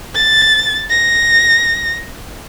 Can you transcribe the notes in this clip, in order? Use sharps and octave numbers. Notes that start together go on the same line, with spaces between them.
A6
A#6